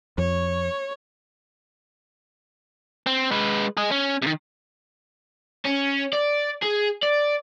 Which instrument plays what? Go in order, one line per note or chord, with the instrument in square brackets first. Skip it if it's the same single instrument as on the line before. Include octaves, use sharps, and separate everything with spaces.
[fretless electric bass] F2 [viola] C#5
[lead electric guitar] C4
G#3 B4
G#4 D#5
C#4
C3 D#3
[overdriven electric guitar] C#4
D5
G#4
D5